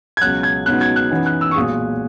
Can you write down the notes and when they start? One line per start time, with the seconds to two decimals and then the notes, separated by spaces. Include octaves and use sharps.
0.17 G#6
0.21 C#2 B2 F#3 F#6
0.43 G#6
0.66 C#2 B2 F#3 B3 D#4 F#6
0.81 G#6
0.96 F#6
1.11 F#2 E3 B3 D#4
1.26 F#6
1.41 E6
1.51 C#6
1.56 B1 A#2 G#3 D#6